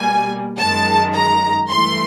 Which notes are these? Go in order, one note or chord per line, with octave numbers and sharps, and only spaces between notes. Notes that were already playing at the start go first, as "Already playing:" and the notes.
Already playing: B2 G3 A#3 G#5
F#2 D#3 G#3 A5
A#5
G2 E3 A3 C6